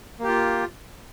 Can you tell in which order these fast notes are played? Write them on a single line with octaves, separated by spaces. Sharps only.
A#3 G4 F4